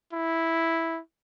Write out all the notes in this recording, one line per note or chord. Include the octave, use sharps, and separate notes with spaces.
E4